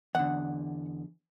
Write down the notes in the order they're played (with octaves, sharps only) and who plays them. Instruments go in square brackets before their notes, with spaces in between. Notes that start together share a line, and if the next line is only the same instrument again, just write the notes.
[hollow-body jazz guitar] E2 D3 [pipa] F#5